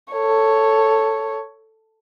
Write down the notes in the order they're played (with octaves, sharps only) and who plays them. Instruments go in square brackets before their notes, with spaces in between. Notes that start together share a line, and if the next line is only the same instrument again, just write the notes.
[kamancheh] A4 C#5